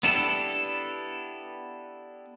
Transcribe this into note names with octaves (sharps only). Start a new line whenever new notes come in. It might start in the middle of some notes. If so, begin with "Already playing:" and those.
B3 D4 E4 G4 A4